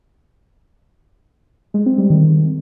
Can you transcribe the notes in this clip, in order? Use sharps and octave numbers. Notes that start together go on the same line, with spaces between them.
G#3
C4
G3
D#3